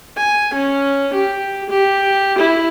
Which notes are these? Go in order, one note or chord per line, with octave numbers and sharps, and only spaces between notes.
G#5
C#4
G4
G4
E4